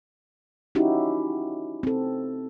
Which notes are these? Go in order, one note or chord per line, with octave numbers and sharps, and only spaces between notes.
C#4 D#4 E4 F#4 G4
C4 A4